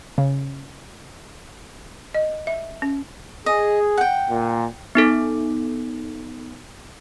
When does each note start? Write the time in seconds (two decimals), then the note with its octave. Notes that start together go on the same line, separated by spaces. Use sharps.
0.18 C#3
2.14 D#5
2.47 E5
2.82 C#4
3.46 G#4 D#5
3.98 F#5 G5
4.30 A#2
4.95 B3 D#4 A4